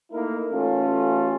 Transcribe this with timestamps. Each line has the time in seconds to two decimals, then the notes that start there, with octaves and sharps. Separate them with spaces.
0.11 A3 A#3 D#4 E4 A#4
0.51 A1 A3 C#4 F4 A4